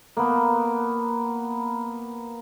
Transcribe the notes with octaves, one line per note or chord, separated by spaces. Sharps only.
A#3 B3